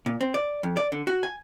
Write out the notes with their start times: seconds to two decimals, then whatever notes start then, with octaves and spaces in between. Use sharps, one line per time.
0.06 A#2
0.21 C4
0.34 D5
0.63 F2
0.77 D5
0.92 D3
1.07 F#4
1.23 G#5